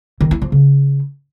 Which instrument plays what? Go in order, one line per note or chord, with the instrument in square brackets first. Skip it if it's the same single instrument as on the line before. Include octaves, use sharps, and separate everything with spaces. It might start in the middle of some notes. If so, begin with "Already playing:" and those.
[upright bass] D#3
E4
F3
C#3